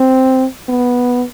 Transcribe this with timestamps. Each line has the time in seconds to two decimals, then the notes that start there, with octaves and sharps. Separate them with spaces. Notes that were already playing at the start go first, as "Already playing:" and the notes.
Already playing: C4
0.69 B3